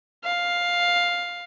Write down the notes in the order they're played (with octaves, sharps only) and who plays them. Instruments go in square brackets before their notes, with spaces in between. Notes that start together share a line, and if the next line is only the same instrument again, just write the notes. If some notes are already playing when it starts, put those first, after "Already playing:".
[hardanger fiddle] F5